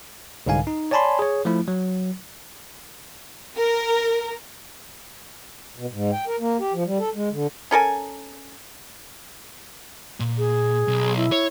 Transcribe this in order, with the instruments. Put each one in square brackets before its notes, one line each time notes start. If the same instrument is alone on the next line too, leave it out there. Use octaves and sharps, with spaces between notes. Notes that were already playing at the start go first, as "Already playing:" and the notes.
[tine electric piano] C2 G#2 D3 F5 G#5
D#4
C#5 D5 G#5 A5 B5 C6
G#4 C#5
F3 A3 E4
F#3
[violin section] A#4
[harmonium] B2
G#2
G5
A#4
A#3
G4
F3
G3
A4
G#3
D3
[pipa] C#4 A4 A#4 G#5
[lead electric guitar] A#2
[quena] G#4
[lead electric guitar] B1
[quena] E4
[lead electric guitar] C#5